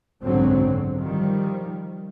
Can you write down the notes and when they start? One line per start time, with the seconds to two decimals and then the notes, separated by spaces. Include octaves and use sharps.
0.23 F#1 B1 G#2 D3 F#3 C4
0.97 D#3 F3 G3